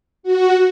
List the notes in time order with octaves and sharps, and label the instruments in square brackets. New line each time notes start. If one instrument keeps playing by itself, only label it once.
[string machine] F#4